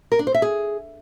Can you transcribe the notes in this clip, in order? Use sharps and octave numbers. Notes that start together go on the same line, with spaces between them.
A#4
D4
C5
E5
G#4